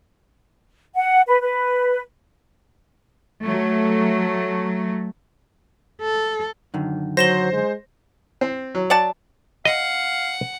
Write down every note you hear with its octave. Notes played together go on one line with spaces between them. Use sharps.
F#5
B4
B4
F#3 A3
A4
F#2 D3 D#3
F#3 C5 A#6 E7 G7
G#3
C4
F#3
D5 F#5 A5
D#5 F5 F#5